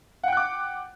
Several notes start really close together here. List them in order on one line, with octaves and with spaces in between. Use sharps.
F#5 G5 F#6 D6